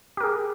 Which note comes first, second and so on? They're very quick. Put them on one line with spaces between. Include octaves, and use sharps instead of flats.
G4 A#4 G#4